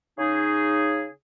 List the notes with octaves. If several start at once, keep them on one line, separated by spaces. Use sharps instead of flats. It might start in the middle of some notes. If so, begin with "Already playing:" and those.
C#3 D#4 G#4